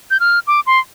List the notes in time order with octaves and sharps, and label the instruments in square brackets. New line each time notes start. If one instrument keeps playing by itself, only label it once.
[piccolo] G6
F6
D6
C6